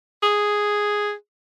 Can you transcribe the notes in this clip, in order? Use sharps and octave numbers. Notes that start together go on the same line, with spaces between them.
G#4